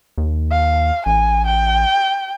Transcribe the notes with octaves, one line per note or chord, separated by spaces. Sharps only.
D#2
F5
A1 G#5
G5